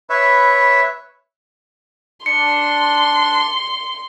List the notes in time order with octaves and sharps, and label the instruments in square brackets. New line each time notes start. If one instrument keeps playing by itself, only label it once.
[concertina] B4 C#5 E5 [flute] B5
[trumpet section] D4 [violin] C6 [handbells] C#7